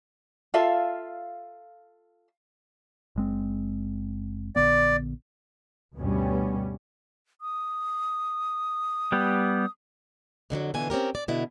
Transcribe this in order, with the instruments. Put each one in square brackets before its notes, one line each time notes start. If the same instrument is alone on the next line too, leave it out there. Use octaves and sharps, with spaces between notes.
[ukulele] F4 A4 E5 F5
[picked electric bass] F#1 G#3 C4
[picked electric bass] A#1 D3 B3 [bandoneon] D5
[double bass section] D2 G2 B2 G3 B3 C#4
[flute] D#6
[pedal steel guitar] G3 B3 G4
[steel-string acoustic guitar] F2 D3 D#3 F#3
B2 D3 E3 F4 G#5
C4 C#4 G4 A#4
D5
B2 D3 E4